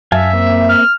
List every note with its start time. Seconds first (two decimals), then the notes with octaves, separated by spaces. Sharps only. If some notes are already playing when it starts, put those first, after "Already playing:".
0.12 F#2 E5 F5 G#5 A5
0.33 A#3 C4
0.69 F6